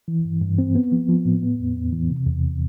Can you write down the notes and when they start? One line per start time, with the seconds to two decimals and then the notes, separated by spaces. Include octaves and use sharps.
0.08 E3
0.25 G2
0.41 G2
0.58 C4
0.75 B3
0.92 F3
1.09 F3
1.25 A2
1.43 B3
1.60 E2
1.77 E2
1.93 E3
2.10 C3
2.27 E2